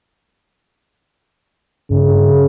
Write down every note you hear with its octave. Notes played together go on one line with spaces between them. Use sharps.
G2 C#3